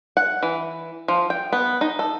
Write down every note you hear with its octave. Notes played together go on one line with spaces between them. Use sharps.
F#5
E3
F3
G5
B3
D#4
A4